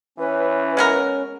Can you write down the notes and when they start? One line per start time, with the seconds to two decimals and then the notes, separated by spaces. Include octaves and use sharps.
0.18 E3 C#4 B4
0.77 G#3 B3 A#4